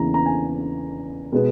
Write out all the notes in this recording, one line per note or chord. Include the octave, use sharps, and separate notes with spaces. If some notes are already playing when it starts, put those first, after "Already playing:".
Already playing: E2 C#3 E3 A#3 A#5
A#5
G#5
B2 G#3 B3